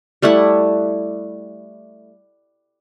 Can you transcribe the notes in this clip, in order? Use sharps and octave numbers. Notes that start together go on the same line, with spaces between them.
G3 A3 E4 F#5